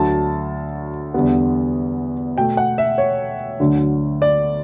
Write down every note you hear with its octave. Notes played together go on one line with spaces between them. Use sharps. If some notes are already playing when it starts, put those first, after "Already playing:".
Already playing: D2 D3 F#3 A5
E2 D3 G3 B3
B2 A3 G5
F#5
E5
C#5
D2 D3 F#3 A3
D5